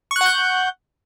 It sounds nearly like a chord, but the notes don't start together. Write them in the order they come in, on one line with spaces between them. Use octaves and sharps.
C#6 F#6 F#5 G6